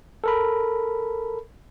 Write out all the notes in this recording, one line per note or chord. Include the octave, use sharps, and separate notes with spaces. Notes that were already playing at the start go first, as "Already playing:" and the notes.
A4 A#4 B5